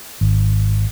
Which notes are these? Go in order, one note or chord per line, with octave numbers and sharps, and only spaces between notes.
G#1